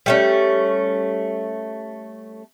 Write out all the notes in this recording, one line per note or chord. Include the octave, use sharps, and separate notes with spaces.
G3 A3 C#4